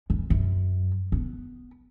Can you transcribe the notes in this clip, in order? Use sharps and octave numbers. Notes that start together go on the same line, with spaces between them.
E2
F#2
B3